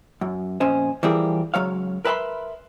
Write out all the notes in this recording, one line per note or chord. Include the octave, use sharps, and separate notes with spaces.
F#2
F2 A#2 C#4 C5 D#5
E3 F3 G3 G4 G#4 A#4
C#2 G#2 F#3 C#5 F5
A#4 B4 E5 A5 B5 C6